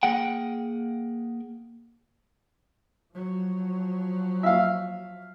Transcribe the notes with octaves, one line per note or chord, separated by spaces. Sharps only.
A#3 G#4 F#5 G5
F3 F#3
E5 F5